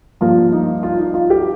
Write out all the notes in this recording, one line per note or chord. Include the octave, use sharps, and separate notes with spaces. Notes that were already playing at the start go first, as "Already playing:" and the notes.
G2 F3 A#3 F4
D#4
F4
D#4
F4
G4